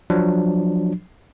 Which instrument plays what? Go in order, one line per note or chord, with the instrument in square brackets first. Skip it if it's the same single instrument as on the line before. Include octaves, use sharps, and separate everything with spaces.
[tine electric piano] F3 F#3 D4